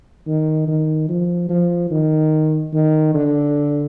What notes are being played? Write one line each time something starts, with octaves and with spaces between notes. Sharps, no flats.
D#3
D#3
F3
F3
D#3
D#3
D3